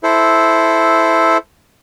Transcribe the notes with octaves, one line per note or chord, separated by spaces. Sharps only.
E4 A4 C5